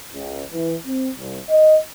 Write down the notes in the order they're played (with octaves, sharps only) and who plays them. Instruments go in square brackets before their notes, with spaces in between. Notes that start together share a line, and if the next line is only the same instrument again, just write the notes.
[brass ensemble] C#2
E3
C4
C2
D#5